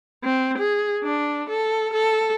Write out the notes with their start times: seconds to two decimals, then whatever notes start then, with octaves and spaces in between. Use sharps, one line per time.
0.24 C4
0.58 G#4
1.04 D4
1.49 A4
1.93 A4